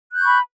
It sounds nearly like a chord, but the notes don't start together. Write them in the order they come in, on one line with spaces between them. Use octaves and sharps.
F#6 G6 C#6 B5